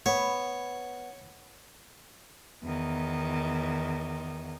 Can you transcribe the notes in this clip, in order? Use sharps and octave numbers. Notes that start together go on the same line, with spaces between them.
B3 C#5
E2 D#3